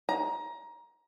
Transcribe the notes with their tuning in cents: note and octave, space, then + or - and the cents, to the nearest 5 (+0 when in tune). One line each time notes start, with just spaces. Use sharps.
A#5 +20